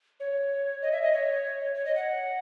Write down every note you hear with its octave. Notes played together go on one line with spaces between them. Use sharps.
C#5
D#5
E5
D#5
C#5
C#5
D#5
F#5